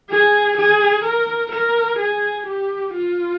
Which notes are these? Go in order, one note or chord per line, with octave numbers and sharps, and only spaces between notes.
G#4
G#4
A#4
A#4
G#4
G4
F4